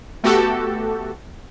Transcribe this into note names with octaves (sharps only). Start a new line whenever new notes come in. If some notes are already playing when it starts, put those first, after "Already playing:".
A3 B3 F#4 G4 A4